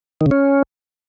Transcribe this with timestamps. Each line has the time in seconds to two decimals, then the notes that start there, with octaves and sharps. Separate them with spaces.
0.21 D#3
0.26 C#3
0.31 C#4